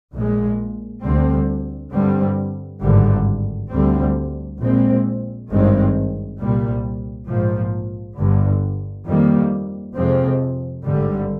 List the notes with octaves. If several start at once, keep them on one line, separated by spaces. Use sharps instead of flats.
A#1 A#2 G#3
D2 D3 G3 C4
G2 D3 G3 C4
G#1 G2 D3 G3
D2 D3 G3 C4
A#1 A#2 G#3 C4
G#1 G2 D#3 G#3 C4
C2 A#2 G3
A#1 G#2 F3
G1 G2 D3
F2 D#3 G3 A#3
F2 C3 F3 G#3 C4
G#1 G2 D3 G3